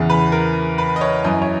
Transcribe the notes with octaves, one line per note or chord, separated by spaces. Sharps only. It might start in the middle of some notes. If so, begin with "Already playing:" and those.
Already playing: E2 C#3 E3
B4
A#4
B4
D#5
C#5
F#2 E3 D#5
C#5